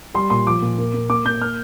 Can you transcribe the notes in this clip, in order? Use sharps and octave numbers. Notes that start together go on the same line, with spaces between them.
G3 C6
A#2 C6
F3 D6
A#2
A#3
A#3
A#3 D6
A#3 G6
A#3 F6